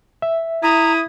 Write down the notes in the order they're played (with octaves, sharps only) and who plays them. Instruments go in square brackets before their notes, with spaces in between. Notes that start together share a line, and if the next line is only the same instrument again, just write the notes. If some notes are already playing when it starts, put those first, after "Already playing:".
[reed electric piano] E5
[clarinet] E4 [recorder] A#5 [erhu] D#6